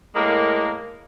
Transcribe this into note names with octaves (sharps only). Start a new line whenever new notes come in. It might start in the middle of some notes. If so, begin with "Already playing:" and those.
A2 G#3 A#3